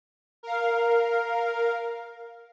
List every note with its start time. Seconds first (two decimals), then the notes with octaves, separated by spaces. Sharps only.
0.43 A#4 F5